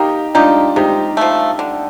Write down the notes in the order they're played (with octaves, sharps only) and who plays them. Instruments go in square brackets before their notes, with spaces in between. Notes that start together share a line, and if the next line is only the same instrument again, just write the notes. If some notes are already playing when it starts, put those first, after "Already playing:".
Already playing: [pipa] A#3 [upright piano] D#4 G4
[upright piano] D4 F4 [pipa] D#4 G4
[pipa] C3 [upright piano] D#4 G4
[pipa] F3 A3
D3